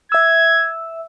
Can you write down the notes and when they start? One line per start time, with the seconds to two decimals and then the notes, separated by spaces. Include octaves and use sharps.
0.12 E5 E6 G#6